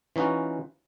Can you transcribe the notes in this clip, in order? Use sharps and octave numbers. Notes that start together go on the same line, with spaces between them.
E3 C#4 D#4 F4 F#4